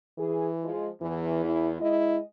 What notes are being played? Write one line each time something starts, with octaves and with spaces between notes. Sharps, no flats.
E3 G#4
F3 G#3
E2 E3
E4
G#3 E4 D#5